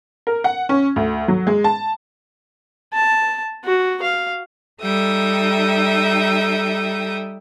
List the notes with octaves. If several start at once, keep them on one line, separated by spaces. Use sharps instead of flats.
A#4
F#5
C#4
D2
F#3
G#3
A5
A5
F#4
F5
G3 D#4 A4 E5 G5 D#6